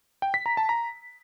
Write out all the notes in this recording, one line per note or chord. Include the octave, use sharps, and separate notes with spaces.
G5
B6
A#5
A5
A#5